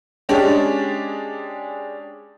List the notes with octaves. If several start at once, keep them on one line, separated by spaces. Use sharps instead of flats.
G#3 C#4 D4 G4 G#4